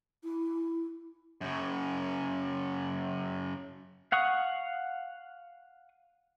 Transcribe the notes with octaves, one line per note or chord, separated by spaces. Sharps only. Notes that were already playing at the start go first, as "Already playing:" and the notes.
E4
F#2 C#3
F5 F#5 C#6 D#6